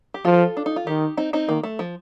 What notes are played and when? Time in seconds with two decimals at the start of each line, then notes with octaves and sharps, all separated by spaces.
0.14 G4
0.25 F3 F4 A4
0.57 D4
0.66 D#4
0.76 F4
0.87 D#3 D#4 G4
1.17 C4 D#4
1.33 C4 D#4
1.49 D#3 A#3
1.63 A3
1.79 F3